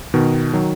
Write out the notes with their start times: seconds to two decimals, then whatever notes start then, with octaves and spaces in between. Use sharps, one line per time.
0.14 B2 D#3
0.53 D#3 F#3